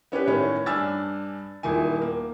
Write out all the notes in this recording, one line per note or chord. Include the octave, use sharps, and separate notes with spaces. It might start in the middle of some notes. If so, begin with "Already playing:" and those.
B3 C#4 G4 B4
A2 D#3 C#4
G2 D4 G#5 E6 F6 A6
D#1 A#2 D#3 E4 G#5
A#3